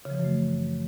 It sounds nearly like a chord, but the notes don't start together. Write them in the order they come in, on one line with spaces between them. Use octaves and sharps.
C#3 F3 E3 F#2 A3